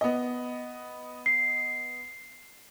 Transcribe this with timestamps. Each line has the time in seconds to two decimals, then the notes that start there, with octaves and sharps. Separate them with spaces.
0.01 B3 D#5
1.26 C7